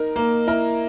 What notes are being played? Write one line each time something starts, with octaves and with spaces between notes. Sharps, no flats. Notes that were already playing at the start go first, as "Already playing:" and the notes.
Already playing: D#4 A#4
A#3
E4 A#4